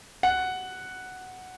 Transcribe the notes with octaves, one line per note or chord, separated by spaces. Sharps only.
F#5